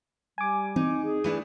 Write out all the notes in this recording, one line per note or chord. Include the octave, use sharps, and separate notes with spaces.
G3 G#5 D6
E3 C4 D#4
G#4
E3 A3 D4 D#7